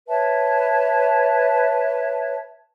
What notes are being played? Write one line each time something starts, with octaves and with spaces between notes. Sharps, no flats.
B4 C#5 E5 A5